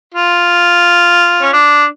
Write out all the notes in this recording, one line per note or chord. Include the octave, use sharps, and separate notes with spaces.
F4
C#4
D4